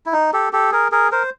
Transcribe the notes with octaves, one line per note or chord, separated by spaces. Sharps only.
E4
D#4
G4 A4
G4 A4
G#4 A#4
G#4 A#4
A#4 C5